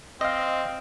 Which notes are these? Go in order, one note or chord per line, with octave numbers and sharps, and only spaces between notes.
C4 D#5 F5